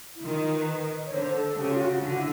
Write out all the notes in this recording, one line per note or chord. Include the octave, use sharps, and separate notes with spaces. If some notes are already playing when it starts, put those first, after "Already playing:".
E4
D#3 F4
B4
C#5
D3 C5
A4
C#3 G4
F4
F#4
D3 F#4
E4